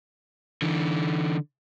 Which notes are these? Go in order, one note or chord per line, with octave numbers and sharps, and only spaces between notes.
D3 E3